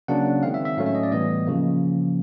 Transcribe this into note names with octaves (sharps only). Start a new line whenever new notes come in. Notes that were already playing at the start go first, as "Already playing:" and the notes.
C#3 F#3 A#3 D4 F#5
D#3 G#3 C4 F5
E5
E5
A2 F#3 A3 C#4 F5
E5
D#5
D5
A2 E3 G3 B3 D#5
C#3 F3 A#3